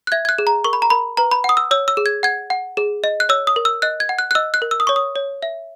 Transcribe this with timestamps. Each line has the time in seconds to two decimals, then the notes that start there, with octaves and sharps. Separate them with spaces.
0.07 F#6
0.12 E5 G#6
0.25 G#6
0.29 F#6
0.38 G#4
0.47 A#5
0.64 A#4 C#6
0.73 B5
0.82 A#5
0.90 A#4 B5
1.17 B4 A#5
1.31 B5
1.44 F#5 D#6
1.57 E6
1.71 C#5 E6
1.88 E6
1.97 G#4
2.06 G#6
2.23 F#5 G#6
2.50 F#5
2.77 G#4
3.04 D#5
3.20 F#6
3.29 C#5 E6
3.47 D#6
3.56 A#4
3.65 E6
3.82 D#5 F#6
4.00 G#6
4.09 F#5
4.19 F#6
4.31 F#6
4.35 D#5 E6
4.54 F#6
4.62 A#4
4.71 E6
4.80 D#6
4.87 C#5 C#6
4.96 D#6
5.16 C#5
5.42 E5